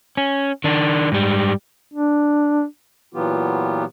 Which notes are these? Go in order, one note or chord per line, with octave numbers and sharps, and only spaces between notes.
C#4
D#3 D4
G#2 G3
D4
A#2 E3 F#3 B3 F4 G4